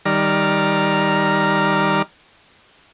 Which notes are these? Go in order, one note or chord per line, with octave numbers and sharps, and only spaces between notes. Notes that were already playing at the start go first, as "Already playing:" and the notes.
D#3 G3 D5 A#5 F6